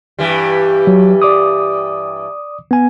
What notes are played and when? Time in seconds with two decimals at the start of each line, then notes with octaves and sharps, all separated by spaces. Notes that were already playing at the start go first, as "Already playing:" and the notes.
0.19 G2 E3 G3
0.87 F#3
1.22 D5 D6 D#6
2.71 B3 G#5